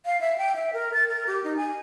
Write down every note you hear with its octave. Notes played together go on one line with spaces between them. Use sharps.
F5
E5
G5
E5
A#4
A6
A#4
G4
D#4
G#5